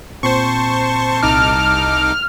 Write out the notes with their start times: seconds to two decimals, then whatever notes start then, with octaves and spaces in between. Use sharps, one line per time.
0.23 A#2 C4 C5 A5 C6 C#6
1.23 C2 D#4 D6 F6